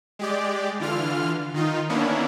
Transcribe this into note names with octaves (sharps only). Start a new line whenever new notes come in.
G#3 G4 D5
D3 E3 F4 F6
D#3 D#4 F4
D#3 A#3 B3 C#4 D4 E4